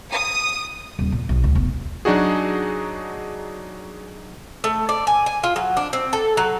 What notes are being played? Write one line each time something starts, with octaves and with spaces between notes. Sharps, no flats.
D#6
D#1
A#2
B1
D2
E1
F#3 D4 D#4 F#4 G#4
A3
D5
G#5
G#5
F4
F#3
D4
C4
A4
F#3